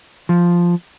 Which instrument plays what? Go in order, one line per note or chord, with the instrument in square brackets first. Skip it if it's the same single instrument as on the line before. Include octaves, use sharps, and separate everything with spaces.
[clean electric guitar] F3